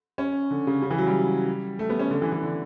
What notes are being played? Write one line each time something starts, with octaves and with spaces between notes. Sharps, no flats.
C#4
D3
C#3
C#3
E3
F#3
G3
A3
B3
C#4
D3
E3
E3
D3